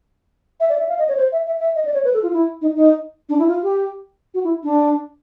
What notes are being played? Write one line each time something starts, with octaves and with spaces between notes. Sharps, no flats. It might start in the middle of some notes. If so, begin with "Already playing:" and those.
E5
D5
E5
F5
D#5
C#5
C5
E5
E5
E5
D#5
D5
C#5
B4
A4
F4
E4
D#4
D#4
D4
E4
F4
G4
F#4
E4
D4